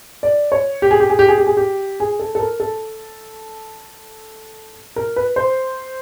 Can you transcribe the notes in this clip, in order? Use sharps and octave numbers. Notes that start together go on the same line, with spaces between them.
D5
C#5
G4
G#4
G4
G#4
G4
G#4
G4
G#4
G4
G#4
A4
A4
A#4
A4
A#4
B4
C5